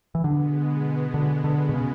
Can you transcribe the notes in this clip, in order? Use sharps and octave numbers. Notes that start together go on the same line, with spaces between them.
E3
B2 D3 G#3 B3
D3
D3
B2
C#3